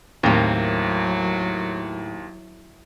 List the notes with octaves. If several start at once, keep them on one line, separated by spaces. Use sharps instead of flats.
D#2 A2 F#3 A#3 C4